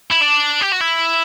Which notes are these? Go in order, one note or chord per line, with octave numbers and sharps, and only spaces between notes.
E4
D4
G4
F#4
E4